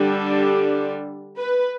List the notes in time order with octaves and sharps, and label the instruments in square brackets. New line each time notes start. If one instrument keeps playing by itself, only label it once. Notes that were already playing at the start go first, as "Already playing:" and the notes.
Already playing: [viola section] D3 G3 D4
B4